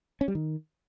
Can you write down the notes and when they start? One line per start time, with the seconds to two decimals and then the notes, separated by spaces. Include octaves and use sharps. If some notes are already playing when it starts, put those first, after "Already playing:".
0.21 C#4
0.28 G3
0.35 D#3